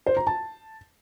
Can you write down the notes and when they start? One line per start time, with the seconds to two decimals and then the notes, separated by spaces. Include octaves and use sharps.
0.07 C5
0.17 A#5
0.27 A5